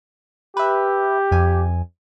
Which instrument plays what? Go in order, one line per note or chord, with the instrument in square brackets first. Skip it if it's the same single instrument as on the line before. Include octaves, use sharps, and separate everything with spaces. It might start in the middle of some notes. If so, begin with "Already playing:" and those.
[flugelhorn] G4 [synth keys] B4 E5
[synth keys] F2 G#5